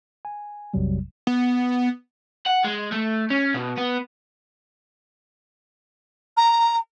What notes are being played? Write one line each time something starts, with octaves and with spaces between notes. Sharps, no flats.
G#5
A#1 F2 C3 F#3 G3
B3
F#5
G#3
A3
C#4
B2
B3
A#5